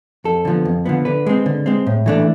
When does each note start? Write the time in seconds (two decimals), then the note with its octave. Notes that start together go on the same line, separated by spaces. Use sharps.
0.24 F2 A4
0.45 D3 F3 B3
0.65 F2
0.86 D3 F3 B3
1.05 D3 B4
1.26 G#3 C4
1.46 D3
1.66 G#3 C4
1.87 A2
2.06 E3 A3 D4